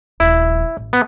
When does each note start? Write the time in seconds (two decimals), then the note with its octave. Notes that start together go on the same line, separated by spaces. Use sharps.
0.20 D#1 F3 E4
0.77 A1
0.93 B3